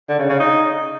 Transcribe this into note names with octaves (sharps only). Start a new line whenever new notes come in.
D3
C#3
C#3
D#4